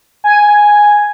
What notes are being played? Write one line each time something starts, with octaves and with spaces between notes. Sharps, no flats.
G#5